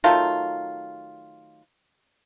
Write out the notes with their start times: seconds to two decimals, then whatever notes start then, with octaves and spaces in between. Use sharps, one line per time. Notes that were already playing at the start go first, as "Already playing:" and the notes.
0.04 D#3 F#3 A3 F4